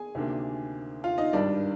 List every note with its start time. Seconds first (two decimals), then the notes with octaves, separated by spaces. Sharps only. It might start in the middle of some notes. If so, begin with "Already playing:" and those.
Already playing: G#4 G#5
0.15 D2 C3 D#3 A#3 D4
1.04 F4 F5
1.18 D#4 D#5
1.33 G#1 G2 D#3 G3 D4 D5